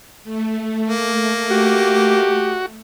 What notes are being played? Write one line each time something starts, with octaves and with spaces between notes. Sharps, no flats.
A3
A#3
F#4 G4